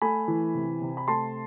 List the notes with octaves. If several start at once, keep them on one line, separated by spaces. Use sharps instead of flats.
A3 G#5 B5
E3
C3
C3
B5
A3 A5 C6